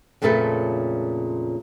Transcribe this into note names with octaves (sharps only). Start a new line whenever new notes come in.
F2 A#2 C#3 A3 A4 B4